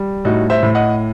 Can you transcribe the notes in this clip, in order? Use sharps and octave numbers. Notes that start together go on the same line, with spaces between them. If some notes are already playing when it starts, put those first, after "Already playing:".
Already playing: G3
A2 D#4 F#4
C5 E5
A2
D#5 F#5